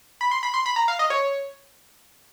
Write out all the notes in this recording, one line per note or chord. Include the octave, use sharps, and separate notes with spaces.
B5
C6
B5
C6
B5
A#5
F5
D#5
C#5